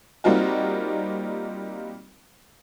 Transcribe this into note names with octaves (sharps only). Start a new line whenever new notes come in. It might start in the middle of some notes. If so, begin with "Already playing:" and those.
G3 A#3 C4 D#4 F4 F#4